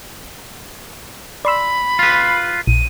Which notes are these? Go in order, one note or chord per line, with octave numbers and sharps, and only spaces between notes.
D5 B5 C6 E6
F4 B4
A#1 D#7